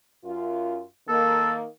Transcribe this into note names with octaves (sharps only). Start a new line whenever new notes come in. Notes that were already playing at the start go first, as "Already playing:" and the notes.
F#2 F4
D#3 A#3 A4